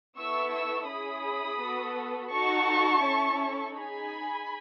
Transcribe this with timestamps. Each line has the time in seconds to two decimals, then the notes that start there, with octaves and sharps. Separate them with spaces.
0.17 B3 E4 A4 C#6 E6
0.53 C#6 E6
0.89 C#4 E4 G#4 B5 D#6
1.60 B3 F#4 A4
2.31 D#4 F#4 A4 A5 C#6
3.03 C#4 E4 A4
3.74 D#4 G#4 G#5 B5